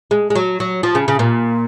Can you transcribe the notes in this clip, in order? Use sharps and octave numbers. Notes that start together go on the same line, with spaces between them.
G#3
G#3
F#3
F#3
F3
C#3
C#3
A#2